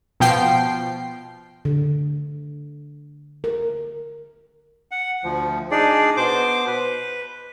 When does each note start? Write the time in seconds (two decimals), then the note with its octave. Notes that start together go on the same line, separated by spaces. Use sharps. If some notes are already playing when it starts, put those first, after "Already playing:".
0.20 B2 F3 G5 C7
1.65 D3
3.44 A#4
4.91 F#5
5.23 D2 F3
5.71 D4 D#4 G#4 D5
6.17 B2 C5 D6
6.67 B4